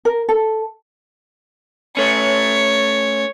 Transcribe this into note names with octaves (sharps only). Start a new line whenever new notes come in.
A#4
A4
A3 C#4 C#5